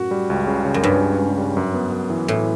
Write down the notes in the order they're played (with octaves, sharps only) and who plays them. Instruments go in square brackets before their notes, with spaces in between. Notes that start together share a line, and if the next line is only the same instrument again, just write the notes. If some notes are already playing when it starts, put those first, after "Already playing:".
Already playing: [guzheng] F#2 A2 [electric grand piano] F#4
[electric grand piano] G3
C#2
C#3
C#3
[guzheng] F#2
[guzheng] G2 [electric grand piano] C#4
[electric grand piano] C#4
C#2
G3
F#2
B3
F#2
E3
[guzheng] A2 [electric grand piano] E3